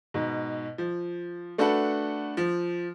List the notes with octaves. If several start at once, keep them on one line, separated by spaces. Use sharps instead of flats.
G#2 B2
F3
A3 D4 F#4 A4 B4 F#5
F3